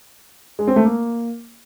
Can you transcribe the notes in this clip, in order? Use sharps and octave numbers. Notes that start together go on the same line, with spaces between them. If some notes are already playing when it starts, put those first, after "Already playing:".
G#3
C4
A3
A#3